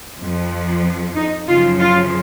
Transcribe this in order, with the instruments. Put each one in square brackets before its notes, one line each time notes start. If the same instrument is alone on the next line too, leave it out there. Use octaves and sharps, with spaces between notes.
[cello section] F2 F3
D#4
F#2 C#3 F3 F4
F4